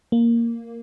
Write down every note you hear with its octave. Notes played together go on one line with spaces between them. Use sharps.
A#3